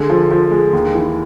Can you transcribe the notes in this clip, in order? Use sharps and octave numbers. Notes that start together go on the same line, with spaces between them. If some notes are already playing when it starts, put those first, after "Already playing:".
Already playing: D3 G#3
F3
F3
G#3
D#2
E3